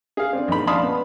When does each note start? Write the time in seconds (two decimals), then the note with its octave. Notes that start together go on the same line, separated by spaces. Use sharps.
0.17 G#4 F5
0.33 C4 D4
0.48 A#1 D#4 B5
0.67 D5 F5 A5 B5 C6 D#6
0.83 B3